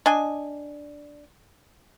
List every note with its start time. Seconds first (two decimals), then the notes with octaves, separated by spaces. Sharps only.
0.06 D4 D#5 G#5